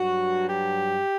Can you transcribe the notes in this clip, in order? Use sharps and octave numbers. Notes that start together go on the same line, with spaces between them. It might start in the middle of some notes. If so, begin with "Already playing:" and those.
Already playing: G2 F#3 F#4
G4